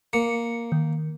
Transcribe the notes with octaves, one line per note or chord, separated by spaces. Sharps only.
A#3 C#7
D#3